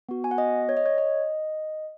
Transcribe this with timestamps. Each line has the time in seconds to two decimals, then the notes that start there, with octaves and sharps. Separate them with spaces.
0.09 B3 F#4
0.24 G#5
0.31 F#5
0.38 D#5
0.69 C#5
0.77 D#5
0.86 C#5
0.98 D#5